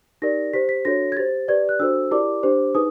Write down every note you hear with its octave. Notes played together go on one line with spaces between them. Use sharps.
D#4 G4 A#4 D5 A#6
G4 C5 B6
B6
D4 F#4 A4 C#5 A#6
G#6
G4 C5 A6
G4 B4 D5 G#6
F#6
D4 F#4 A4 C5 E6
E4 G4 A#4 D5 D6
D4 G4 C5
D#4 G#4 B4 D#6